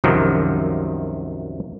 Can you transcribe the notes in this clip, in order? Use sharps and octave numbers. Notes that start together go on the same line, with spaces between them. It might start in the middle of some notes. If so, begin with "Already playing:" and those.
C2 F#2 C3 D#3 F3 F#3